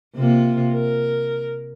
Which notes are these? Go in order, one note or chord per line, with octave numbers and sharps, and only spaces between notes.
C3 A#3 F4
A#4